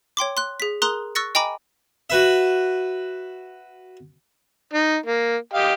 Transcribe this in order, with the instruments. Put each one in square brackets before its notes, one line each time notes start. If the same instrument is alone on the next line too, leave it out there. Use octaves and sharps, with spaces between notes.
[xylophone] C#5 G5 C6 D6
C6 F#6
G#4 B6
G#4 A#4 A#5 C6 D#6 F#6
C#6 E6 F#6 A6 A#6 C#7
D#5 G5 G#5 A#5 B5 D6
[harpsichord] F#4 B4 E5
[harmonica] D#4
A#3
G4 D#5 F5